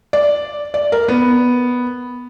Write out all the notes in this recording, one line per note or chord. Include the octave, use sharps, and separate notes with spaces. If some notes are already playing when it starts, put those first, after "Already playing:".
D5
D5
A#4
B3